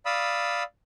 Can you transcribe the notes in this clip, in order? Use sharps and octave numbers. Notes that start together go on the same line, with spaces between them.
D5 F5 B5 D#6 E6